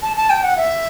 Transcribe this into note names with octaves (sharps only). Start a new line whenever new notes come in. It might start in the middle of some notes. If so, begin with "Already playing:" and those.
A5
A5
G5
F#5
E5